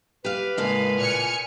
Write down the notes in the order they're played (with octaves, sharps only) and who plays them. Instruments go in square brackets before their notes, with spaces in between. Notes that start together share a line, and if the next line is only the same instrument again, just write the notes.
[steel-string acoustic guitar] G4 F5 [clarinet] B4
[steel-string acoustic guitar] A2 C#3 A#3 [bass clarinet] G#3 [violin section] F5
[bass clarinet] A#2 [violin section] G#5 F6 C#7